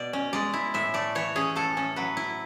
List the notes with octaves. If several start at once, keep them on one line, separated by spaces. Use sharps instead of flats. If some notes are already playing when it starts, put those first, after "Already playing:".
Already playing: B2 D5
C#4
G#3 D5
E4
A2 E5
A3 D5
E3 C#5
C#4 G#4
A2 A4
C#4
F#3 B4
E4